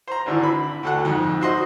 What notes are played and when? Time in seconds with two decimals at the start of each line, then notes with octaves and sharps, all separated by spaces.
0.07 C5 A#5
0.26 G#1 D3 E3
0.43 B5
0.83 D2 A4 F#5
1.05 F2 G#2
1.41 F#4 C5 D#5